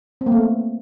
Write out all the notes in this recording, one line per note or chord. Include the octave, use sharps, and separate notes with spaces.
C4
A#3
A3
B3